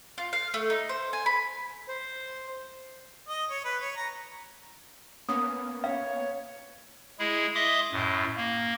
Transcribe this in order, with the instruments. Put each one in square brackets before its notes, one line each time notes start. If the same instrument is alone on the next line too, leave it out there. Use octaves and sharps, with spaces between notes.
[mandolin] F4
F5
A3
D#4
C5
G#5
B5
[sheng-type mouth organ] C5
[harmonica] D#5
C#5
B4
C#5
A#5
[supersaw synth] A#3 B3 C#4 [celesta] D#6
[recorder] C#5 [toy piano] F5
[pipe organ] G#3 E4 G#4
D#5 E5 C6 D6 D#6
F#2 A2
A#3